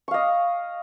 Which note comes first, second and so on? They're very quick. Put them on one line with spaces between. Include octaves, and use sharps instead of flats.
C#6 F5 D#5